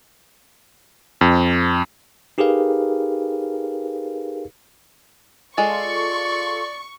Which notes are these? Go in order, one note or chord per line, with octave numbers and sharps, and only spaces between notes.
F2
D#4 G4 G#4 A#4 B4 F5
G#3 F4 A4 D5 C6 C#6